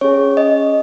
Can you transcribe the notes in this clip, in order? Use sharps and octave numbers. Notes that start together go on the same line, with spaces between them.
C#4 G#4 C#5
D#5